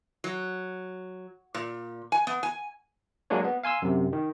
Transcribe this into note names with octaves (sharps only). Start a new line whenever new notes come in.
F#3
A#2
G#5
B3
G#5
F#3 G#3 A#3 D4 C#5
B3
F5 G#5 C6 E6
F#2 C3
D#3